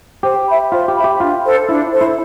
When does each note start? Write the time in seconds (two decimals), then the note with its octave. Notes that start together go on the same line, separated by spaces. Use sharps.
0.23 G4 C5
0.48 E5 B5
0.71 F4 C5
0.88 G4
0.96 E5 B5
1.04 G4
1.20 D4 F4
1.45 A4 C5
1.69 D4 E4
1.93 A4 C5
2.01 E4